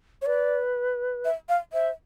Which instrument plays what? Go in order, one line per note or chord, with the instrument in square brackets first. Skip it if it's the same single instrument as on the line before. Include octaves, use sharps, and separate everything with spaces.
[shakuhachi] C#5
[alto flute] B4 [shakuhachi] D5
[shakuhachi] E5
F5
[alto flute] C5 [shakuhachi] E5